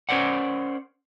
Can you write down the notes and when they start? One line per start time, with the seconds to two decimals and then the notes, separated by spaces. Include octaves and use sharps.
0.09 C#4 A#4 C5 D5 F#5